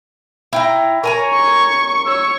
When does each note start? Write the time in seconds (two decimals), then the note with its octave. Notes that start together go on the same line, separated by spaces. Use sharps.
0.53 E4 G5 A#5
1.04 A#4 C#5 G#5 A#5
1.34 C#6
2.06 C#5 C#6 E6